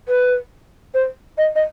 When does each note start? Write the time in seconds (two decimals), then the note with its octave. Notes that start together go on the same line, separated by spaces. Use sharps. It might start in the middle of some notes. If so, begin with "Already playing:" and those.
0.08 B4
0.94 C5
1.38 D#5
1.55 D#5